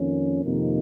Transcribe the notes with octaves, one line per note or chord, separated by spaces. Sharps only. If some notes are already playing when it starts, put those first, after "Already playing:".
Already playing: F2 D#3 A#3 C#4
F2 C3 D#3 A#3 D#4